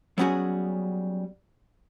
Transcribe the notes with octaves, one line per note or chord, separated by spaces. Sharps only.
F#3 G3 B3 C#4 F#4 G#4